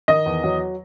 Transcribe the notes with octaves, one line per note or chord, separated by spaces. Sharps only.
D#3 D#5
E2
F#3